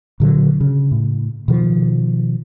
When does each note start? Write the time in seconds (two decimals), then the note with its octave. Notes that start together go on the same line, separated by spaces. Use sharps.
0.20 A#2 D3 F3 F#3
0.60 C#3
0.92 A2
1.48 B2 D#3 F3